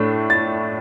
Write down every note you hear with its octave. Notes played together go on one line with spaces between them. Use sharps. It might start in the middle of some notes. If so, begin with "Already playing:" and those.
Already playing: A2 A3 D4
A6